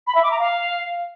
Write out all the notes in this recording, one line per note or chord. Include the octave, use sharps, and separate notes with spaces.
B5
E5
D6
A#5
F5